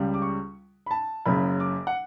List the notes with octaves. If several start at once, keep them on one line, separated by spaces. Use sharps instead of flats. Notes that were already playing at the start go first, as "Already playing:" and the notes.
Already playing: C#2 C#3 G3
D6
C#6
B5
A5
F#1 F#2 C#3 B5
D6
F#5